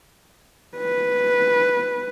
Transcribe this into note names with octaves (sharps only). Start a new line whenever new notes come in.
B4